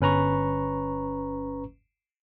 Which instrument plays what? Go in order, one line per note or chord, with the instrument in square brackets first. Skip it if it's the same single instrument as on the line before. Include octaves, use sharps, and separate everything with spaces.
[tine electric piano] G1 C#4 B4 A#5 C#6